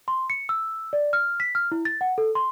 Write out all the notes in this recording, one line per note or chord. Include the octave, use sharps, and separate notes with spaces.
C6
C#7
E6
D5
F6
B6
F6
E4
A6
F#5
A4
C6